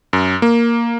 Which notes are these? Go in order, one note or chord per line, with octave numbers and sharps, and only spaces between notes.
F#2
A#3